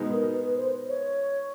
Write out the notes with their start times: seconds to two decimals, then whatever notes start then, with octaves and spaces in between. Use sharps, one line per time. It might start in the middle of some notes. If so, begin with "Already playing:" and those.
Already playing: B2 G#3 B3 D#4
0.12 A#4
0.34 B4
0.57 C5
0.85 C5
0.89 C#5